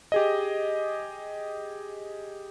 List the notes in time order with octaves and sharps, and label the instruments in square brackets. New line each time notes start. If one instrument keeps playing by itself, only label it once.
[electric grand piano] G4 G#4 D#5